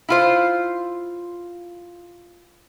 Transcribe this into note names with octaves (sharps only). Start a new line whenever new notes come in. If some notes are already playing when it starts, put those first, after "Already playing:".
E4 F4 C5